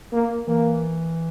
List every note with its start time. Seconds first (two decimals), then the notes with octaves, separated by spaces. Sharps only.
0.13 A#3
0.47 E3 A#3